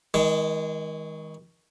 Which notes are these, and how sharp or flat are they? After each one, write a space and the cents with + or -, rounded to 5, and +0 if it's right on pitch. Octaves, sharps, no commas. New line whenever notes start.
D#3 +30 G#3 -15